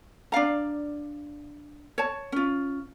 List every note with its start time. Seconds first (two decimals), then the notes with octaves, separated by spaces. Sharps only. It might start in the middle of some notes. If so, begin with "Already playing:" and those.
0.32 D4 D5 F5 A#5
1.98 C#5 A5
2.32 C#4 F4